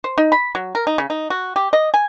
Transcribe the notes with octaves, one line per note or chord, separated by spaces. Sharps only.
C5
D#4
B5
F#3
A#4
D#4
C#3
D#4
F#4
G4
D#5
G#5